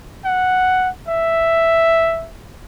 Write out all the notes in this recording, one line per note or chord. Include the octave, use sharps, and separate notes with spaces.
F#5
E5